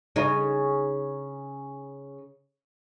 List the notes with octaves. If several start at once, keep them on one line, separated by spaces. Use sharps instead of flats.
C#3 D#4